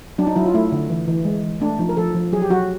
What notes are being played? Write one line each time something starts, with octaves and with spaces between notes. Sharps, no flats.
F#3 D4
D#4
F#3 E4
F4
A3 E4
D3
E3
E3
G#3
E3
A3 D4
F3 D#4
A#4
F3 A4
F3
F#3 G#4
G4
F#3 F#4